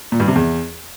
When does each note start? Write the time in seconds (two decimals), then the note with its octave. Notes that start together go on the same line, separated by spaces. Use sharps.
0.12 A#2
0.20 G2
0.28 C3
0.35 E2